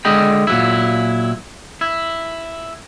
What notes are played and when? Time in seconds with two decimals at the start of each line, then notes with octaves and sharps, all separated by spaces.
0.05 D3 G#3 D#5 G5 B5
0.47 A#2 F#3 E4
1.81 E4